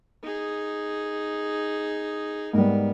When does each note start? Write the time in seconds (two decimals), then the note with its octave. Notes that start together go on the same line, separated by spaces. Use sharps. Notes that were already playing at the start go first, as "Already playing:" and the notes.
0.23 D#4 G#4
2.53 G#2 G3 B3 A#4